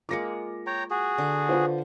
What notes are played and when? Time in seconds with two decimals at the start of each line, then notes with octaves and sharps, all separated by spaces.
0.09 G#3 A#3 F4 D6 A#6 C#7
0.67 C#5 G5 A#5
0.90 F#4 G#4
1.18 D3
1.49 F4 B4 C5